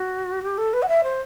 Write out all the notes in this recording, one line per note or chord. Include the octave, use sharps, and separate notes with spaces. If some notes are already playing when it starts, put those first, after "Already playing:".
Already playing: F#4
G4
A4
B4
F#5
E5
C5